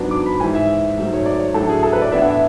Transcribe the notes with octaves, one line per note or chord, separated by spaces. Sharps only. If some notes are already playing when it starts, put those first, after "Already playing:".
Already playing: G#2 F#3 B3 D4
D6
B5
G#2 E3 G#3 G#5
E5
G#2 F#3 A3
C#5
D5
C#5
A2 F#3 A3 D4 A4
G#4
A4
B4
D5
A2 E3 B3 D4 E5
F#5
E5